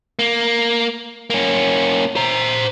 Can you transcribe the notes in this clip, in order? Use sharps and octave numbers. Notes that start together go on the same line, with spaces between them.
A#3
A#3 C#4
C5 A#5